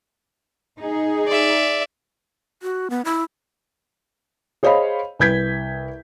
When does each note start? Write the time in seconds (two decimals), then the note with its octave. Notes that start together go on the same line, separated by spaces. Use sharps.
0.80 D#4 G#4
1.28 D5 E5
2.63 F#4
2.90 B3
3.05 E4
4.63 G#4 C5 C#5 D#5 F5 B5
5.19 C2 B4 G6 G#6 B6